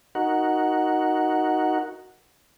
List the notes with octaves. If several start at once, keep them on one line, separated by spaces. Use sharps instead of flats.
D#4 F#4 A#4 F#5